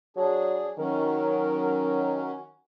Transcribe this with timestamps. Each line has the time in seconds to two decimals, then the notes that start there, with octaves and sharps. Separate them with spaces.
0.17 F#3 D4 G#4
0.79 D#3 F#3 C#4 A#4